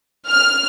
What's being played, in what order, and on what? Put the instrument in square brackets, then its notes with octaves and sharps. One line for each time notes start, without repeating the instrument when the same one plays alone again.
[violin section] F6